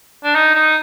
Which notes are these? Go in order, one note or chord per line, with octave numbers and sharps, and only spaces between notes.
D4
D#4
D#4